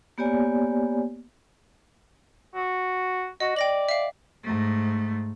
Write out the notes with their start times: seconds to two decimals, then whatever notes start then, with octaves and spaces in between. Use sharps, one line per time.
0.18 A#3 B3 G4 C#5 D5 G#5
2.55 F#4
3.40 F#4 D#5
3.56 D5 G5 A#6 F#7
3.89 E5 F5
4.43 G#2 A3